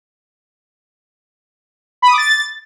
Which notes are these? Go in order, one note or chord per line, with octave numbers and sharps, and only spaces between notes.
B5
D#6
D6
A6